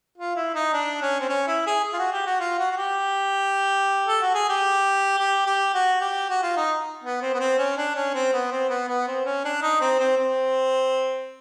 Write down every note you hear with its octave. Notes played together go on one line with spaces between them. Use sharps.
F4
E4
D#4
D4
C#4
C4
C#4
E4
G#4
G#4
F4
F#4
G4
F#4
F4
F#4
F#4
G4
A4
F#4
G#4
G4
G4
G4
F#4
G4
F#4
F4
D#4
B3
C4
B3
C4
C#4
D4
C#4
C4
B3
C4
B3
B3
C4
C#4
D4
D#4
C4
C4
C4